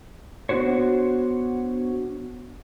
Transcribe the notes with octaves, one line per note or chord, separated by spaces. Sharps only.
B3 D4 F#4 C5 C#5